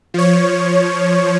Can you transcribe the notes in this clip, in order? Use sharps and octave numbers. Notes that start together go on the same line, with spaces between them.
F3 C#5